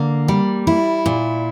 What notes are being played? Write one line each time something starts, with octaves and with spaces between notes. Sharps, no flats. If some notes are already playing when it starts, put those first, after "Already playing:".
Already playing: D3 A#3
G3
E4
A#2